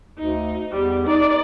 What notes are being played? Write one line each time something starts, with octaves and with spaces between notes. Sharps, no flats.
D2 D#4
E2 G3
D#4 D5